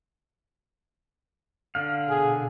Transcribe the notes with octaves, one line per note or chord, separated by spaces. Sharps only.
D3 F5
B2 G#4